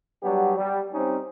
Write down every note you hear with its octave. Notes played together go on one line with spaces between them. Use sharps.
F#3 G3 B3 D4 G4
G3
G3 C4 C#4 D#4